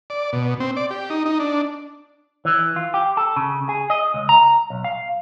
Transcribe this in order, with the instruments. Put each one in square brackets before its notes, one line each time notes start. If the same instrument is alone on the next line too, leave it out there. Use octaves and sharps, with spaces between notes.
[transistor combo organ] D5
B2
C4
D5
G4
D#4
D#4
D4
[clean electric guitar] E3
F4
G4
A4
C#3
G#4
D#5
C#2
A#5
B1
F5